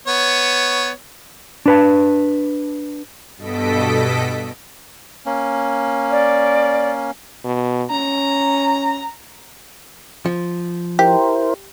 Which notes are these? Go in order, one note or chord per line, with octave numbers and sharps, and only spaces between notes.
B3 C#5
D4 B4 A5
G2 B2 A4 D#5 B6 D7
A#3 C#4
D5
B2
C#4 A#5
F3
E4 G4 A#4 C5